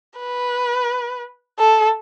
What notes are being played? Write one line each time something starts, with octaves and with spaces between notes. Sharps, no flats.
B4
A4